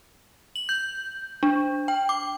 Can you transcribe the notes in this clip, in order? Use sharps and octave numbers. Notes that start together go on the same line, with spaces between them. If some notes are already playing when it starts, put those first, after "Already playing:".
F#7
G6
D4
G5
D6